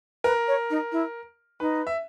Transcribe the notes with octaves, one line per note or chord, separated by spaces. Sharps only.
A#4 B4
C#5
D#4
E4
D#4 B4
E5